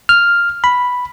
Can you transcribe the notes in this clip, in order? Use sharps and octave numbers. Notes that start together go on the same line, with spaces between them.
F6
B5